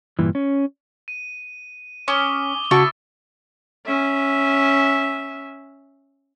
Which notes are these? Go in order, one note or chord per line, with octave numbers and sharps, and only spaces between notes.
G2 A#2 E3
C#4
D#7
C#4 D6 D#6 G7
C#3 E4 F#4 A5 C#6 A6
C#4 E5